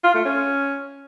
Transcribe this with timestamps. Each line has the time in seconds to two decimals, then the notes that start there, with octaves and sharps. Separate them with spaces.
0.04 F4
0.15 A3
0.25 C#4